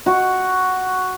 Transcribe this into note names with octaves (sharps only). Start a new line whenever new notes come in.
F#4